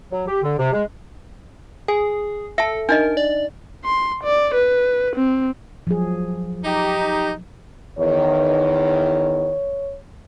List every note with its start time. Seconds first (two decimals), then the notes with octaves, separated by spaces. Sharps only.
0.11 F#3
0.27 G4
0.42 D3
0.57 C3
0.73 G#3
1.88 G#4 G#5
2.58 A4 E5 A5
2.89 D4 D#4 A#4 D#5
3.17 D5
3.84 C6
4.23 D5
4.54 B4
5.16 C4
5.87 F3 F#3 G#4
6.64 D#4 G4
7.99 E2 D#3 C#5